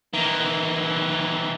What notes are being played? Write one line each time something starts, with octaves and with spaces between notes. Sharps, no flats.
D#3 E3